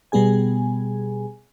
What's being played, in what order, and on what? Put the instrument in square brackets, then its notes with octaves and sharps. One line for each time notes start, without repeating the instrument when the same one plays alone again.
[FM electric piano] B2 G3 B3 G#4 G#5